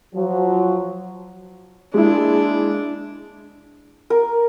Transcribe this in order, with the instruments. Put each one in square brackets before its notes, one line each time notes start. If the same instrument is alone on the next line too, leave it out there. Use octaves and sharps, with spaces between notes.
[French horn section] F3 F#3
[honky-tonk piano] G#3 A#3 E4 [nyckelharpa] D4
[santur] A#4